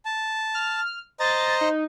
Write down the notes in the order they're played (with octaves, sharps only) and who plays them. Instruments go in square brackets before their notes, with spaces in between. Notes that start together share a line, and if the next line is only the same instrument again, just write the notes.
[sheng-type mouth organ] A5
[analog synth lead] F6
[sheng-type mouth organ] C5 D#5 A#5 [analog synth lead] A6
[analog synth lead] D#4